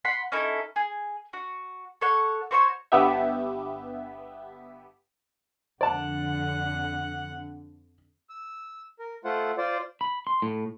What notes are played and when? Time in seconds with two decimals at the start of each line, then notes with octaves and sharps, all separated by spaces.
0.05 F#5 B5 C6
0.32 C#4 D#4 E4 A4
0.76 G#4
1.33 F#4
2.01 A4 C#5 F#5
2.51 F#4 C5 C#5 C#6
2.92 G1 G2 B3 G4 E5
5.81 F2 D3 D5 F#5 A5
8.29 E6
8.99 A#4
9.24 A3 F4 C5 F#5
9.58 F4 C5 D5
10.01 B5
10.27 C6
10.42 A2